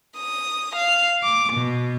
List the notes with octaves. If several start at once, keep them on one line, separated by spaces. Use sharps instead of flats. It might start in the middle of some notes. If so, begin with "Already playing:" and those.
D#6
F5
D6
B2